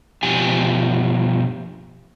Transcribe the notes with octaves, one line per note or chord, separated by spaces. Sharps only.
B2 F3 G4 G#5